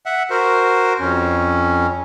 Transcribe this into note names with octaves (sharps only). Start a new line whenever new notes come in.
E5 F#5
F#4 A#4 C5
F2 C#4